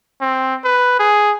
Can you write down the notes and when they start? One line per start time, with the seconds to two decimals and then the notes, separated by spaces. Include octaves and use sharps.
0.21 C4
0.64 B4
0.99 G#4